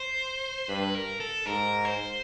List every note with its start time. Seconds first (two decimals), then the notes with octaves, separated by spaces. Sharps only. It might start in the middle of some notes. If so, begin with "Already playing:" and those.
Already playing: C5
0.69 G2 B4
0.95 A#4
1.20 A4
1.46 G#2 A#4
1.85 C5